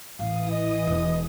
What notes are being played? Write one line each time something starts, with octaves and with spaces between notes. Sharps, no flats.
D#1 A1 E3 F5 D#6
D#5
E1 D4